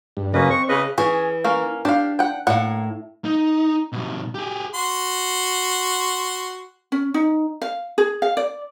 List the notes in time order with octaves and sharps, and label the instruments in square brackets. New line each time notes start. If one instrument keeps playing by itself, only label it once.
[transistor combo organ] G2
[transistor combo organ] F#2 C#3 [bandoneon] A#3 C#4 B4 [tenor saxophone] D#5
[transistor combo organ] C4 [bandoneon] C#6
[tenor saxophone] C#3 [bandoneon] B4 D#5
[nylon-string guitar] E3 [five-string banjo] C#4 G#4
[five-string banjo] A#3 C#4 A#4
[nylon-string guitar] D4 [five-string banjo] G4 F5
[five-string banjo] F#5 G5
[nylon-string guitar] A2 [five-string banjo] A#3 F#5
[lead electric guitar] D#4
B2 G3
G4 G#4
[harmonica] F#4 C6
[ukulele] C#4
D#4
F5
G#4
F5
D5